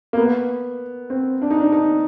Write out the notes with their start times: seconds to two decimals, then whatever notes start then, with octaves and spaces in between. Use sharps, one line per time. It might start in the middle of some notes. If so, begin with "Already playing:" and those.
0.13 A#3
0.17 B3
1.10 C4
1.42 D4
1.50 D#4
1.60 D4
1.72 D#4